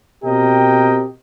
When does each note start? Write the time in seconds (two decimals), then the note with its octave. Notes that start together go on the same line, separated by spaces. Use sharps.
0.24 B2 C4 G4 A#4 D#5 G5